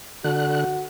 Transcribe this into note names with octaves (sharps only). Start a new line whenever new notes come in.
D3 F#4 F#6